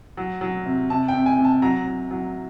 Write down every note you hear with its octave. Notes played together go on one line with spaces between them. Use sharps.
F#3
F#3
C3
C3 A5
G5
C3
G#5
C3
A5
F#3 A#5
F#3
F#3